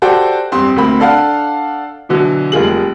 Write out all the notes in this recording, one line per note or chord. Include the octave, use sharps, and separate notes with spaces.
F#4 G4 A4 C5 D5 G5
E2 G2 C4 C6
D2 A#3 C4 B5
D4 A4 F5 F#5
B2 D3 E3 F#3
F1 G3 A#3 F4 G#4 F#7